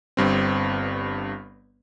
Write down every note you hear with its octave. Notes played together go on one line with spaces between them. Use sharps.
G1 G2 C4